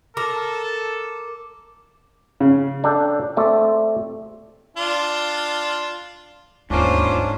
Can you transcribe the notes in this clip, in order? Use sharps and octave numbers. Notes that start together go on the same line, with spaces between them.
A4 A#4 D6
C#3
D4 A4 G5
A3 C4 D5
D4 F4
D1 D#2 G#2 A#3 C#4 D4 F4 C5